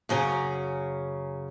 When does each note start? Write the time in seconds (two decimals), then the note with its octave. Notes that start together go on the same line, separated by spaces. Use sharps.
0.09 F#2 C#3 C#4 A#5